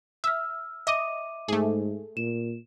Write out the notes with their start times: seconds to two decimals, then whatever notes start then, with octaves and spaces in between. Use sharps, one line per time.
0.24 E5 E6 F6
0.87 D#5 E5 D6 D#7
1.48 G#2 A3 G#4
2.17 A#2 E7